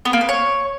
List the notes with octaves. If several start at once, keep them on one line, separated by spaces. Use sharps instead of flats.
B3
A#3
B4
C#5